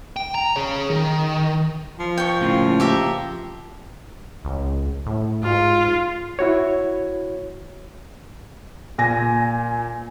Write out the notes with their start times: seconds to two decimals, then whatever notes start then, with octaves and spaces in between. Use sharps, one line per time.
0.16 G5
0.35 A#5
0.56 G#4 C#5
0.90 D#3
2.00 F3
2.18 G5 C#6
2.41 A2 C#3 A#3
2.80 G4 E5 A#5
4.45 C#2
5.06 A2
5.43 G#2 F4
6.39 E4 F#4 C#5
8.98 A#2 G#5 A#6